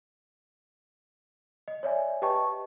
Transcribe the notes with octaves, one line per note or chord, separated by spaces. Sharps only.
D#5
C#5 D5 E5 G#5
G4 B4 D#5 G5 A5 C#6